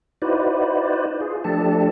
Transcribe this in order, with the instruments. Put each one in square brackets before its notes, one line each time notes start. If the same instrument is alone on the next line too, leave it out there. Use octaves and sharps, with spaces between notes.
[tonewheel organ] D#4 E4 F#4 B4 C5 D5
F4 G#4
F3 A3 D4 G4 A4 A5